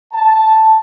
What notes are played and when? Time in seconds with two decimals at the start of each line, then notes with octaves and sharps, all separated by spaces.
0.13 A5